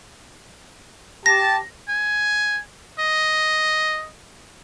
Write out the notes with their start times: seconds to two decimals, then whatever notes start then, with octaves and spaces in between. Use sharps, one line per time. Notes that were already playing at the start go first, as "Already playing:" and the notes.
1.26 G4 A5 A#6
1.88 G#5
2.99 D#5